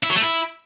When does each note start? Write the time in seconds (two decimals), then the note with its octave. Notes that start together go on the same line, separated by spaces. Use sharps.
0.04 E4
0.10 F#3
0.16 A3
0.23 E4